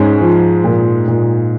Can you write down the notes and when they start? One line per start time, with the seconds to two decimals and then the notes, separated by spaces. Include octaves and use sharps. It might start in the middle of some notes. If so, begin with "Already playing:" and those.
Already playing: G#2 G#3 C#4
0.21 F3
0.64 A#2
1.08 A#2